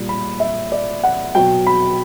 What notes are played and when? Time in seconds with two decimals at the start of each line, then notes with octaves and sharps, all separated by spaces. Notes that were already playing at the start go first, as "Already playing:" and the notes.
Already playing: A#2 G3
0.09 B5
0.40 E5
0.72 D5
1.04 F#5
1.35 B2 F#3 G5
1.67 B5